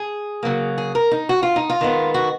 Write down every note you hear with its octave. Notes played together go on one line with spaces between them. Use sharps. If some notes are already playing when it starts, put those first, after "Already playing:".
Already playing: G#4
C#3 F#3 A#3
G#4
A#4
D#4
F#4
F4
D#4
F4
D#3 G#3 B3
F#4